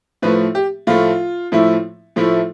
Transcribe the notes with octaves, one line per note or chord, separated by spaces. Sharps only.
A2 F3 A3 B4
G4
A2 F3 A3 F4
A2 F3 A3 E4
A2 F3 A3 E4